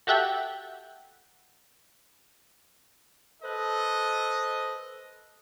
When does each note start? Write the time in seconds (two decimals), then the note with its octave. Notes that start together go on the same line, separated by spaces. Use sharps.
0.07 F#4 G4 A4 E5 F#5 G5
3.42 A4 B4 C5 D#5